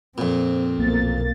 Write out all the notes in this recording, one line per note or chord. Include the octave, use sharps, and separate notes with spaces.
F2 A#2 C4
B1 A#3 A6